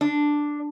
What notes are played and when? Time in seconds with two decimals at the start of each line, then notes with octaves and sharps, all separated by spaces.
0.01 D4